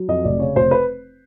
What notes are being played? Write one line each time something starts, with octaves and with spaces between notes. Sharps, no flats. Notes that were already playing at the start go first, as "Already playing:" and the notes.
Already playing: F#3
F2 D#5
F1 D5
C#3 C#5
F1 C5
B4